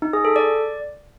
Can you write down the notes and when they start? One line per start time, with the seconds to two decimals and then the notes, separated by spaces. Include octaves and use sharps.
0.02 D#4
0.13 G#4
0.25 A4
0.36 D5